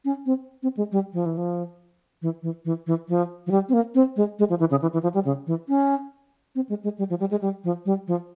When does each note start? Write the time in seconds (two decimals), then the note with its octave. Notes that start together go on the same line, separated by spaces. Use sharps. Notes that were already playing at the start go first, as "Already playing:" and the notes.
0.05 C#4
0.26 C4
0.63 C4
0.77 G#3
0.92 G3
1.13 F3
1.26 E3
1.37 F3
2.22 E3
2.43 E3
2.65 E3
2.87 E3
3.09 F3
3.47 F3
3.51 G3
3.69 C4
3.73 A#3
3.95 C4
4.16 G#3
4.39 G#3
4.50 F3
4.60 E3
4.71 C#3
4.82 E3
4.93 E3
5.03 F3
5.14 G3
5.25 C#3
5.47 E3
5.69 C#4
6.55 C4
6.69 G#3
6.84 G#3
6.98 G3
7.10 F3
7.20 G3
7.31 G#3
7.41 G3
7.64 F3
7.86 G3
8.07 F3